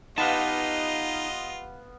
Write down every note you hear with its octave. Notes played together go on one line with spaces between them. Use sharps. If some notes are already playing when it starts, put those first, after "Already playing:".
B3 D#4 F4 G4 B4 D#5 F5 A5